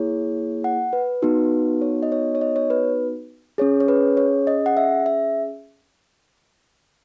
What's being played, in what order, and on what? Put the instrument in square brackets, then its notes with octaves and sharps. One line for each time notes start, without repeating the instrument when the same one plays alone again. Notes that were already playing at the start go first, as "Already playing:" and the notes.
Already playing: [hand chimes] A#3 E4 G#4 C#5
F#5
B4
B3 D#4 F#4
C#5
D#5
C#5
C#5
D#5
C#5
B4
C#4 G#4 C#5
C#5
B4
C#5
D#5
F#5
E5
E5